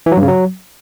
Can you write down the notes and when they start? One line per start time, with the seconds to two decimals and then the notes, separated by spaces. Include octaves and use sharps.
0.06 E3
0.12 F#3
0.17 G2
0.22 C#3
0.28 F#3